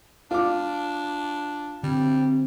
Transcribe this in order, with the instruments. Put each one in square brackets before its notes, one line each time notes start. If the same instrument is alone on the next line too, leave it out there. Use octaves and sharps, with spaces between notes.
[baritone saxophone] D4 [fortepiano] F4 D6
[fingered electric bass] D3 [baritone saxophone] G3 [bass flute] C4